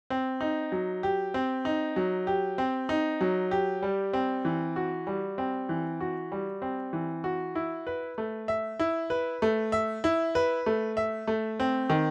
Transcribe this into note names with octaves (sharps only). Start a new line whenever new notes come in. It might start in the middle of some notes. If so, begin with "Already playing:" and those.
C4
D#4
F#3
G4
C4
D#4
F#3
G4
C4
D#4
F#3
G4
G3
C4
E3
F#4
G3
C4
E3
F#4
G3
C4
E3
F#4
E4
B4
A3
E5
E4
B4
A3
E5
E4
B4
A3
E5
A3
C4
D#3